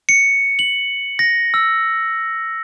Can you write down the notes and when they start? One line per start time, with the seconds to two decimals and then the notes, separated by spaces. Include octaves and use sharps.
0.09 C#7
0.59 F#7
1.19 A#6
1.54 E6